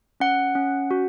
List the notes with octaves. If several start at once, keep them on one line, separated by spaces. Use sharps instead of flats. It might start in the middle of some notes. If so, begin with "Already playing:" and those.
C#4 F#5
C#4
F#4